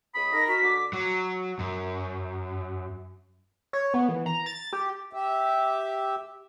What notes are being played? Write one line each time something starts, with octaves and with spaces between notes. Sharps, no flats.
C#2 B5 D#6
D#4 A#4 A#6
F#4 B6
D3 D6
F#3
F#2
C#5
B3
E3
A#5
A6
G4
G4 E5